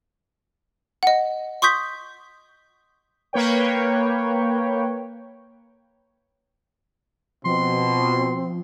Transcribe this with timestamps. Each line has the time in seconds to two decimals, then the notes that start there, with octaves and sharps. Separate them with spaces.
1.03 D#5 F#5
1.62 C6 C#6 D#6 G6 B6
3.33 A#3 B4 C#5 G5
7.45 B2 F3 C4 C6